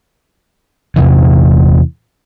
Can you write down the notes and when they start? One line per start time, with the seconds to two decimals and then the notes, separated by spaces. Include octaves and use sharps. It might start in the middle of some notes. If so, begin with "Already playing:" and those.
0.96 E2 C3 E3